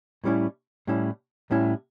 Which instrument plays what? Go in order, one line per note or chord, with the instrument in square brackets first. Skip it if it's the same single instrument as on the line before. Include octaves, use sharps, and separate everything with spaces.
[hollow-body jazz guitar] A2 G3 C#4 E4
A2 G3 C#4 E4
A2 G3 C#4 E4